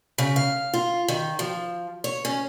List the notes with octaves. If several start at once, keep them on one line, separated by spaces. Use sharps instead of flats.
C#3
F5
F4
D#3
F3
C#5
C#4